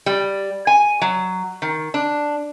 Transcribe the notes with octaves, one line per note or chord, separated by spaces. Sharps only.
G3
G#5
F#3
D#3
D4